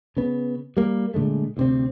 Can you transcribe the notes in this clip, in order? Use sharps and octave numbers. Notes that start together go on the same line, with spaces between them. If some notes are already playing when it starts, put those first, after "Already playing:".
C#3 B3
G3 A#3
A#2 D3 G#3 A3
D2 C3 C4